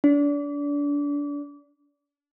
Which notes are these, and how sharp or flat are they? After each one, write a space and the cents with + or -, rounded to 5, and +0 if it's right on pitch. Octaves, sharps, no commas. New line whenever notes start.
D4 -30